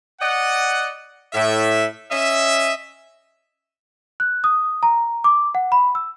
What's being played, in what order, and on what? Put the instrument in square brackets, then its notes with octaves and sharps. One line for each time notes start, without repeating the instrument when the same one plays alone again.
[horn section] D5 D#5 F#5
A2 E5
C#4 D#5 E5
[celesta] F#6
D#6
A#5
D6
F#5
B5
E6